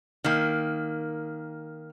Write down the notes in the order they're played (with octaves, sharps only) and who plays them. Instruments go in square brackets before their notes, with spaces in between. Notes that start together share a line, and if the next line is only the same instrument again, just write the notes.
[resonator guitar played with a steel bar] D#3 A#3